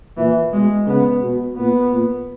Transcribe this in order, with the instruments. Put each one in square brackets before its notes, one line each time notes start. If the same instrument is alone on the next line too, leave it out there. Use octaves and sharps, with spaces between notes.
[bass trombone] A#2 [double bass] E3
[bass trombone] B2 [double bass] G#3
[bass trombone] C#3 [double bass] B3
[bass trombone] B2
[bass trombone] A#2 [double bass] B3
[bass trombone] A#2